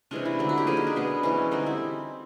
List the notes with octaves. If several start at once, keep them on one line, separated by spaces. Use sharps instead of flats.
C3 E3 G#3 C#4 D4
E4
D3 F#3 A3 C4
F#4
G4
F3 A#3 C#4 G#4
D#4
D4
B2 G#3 B3
E3 G#3 C4 C#4
D3 G3 C4 D#4
E4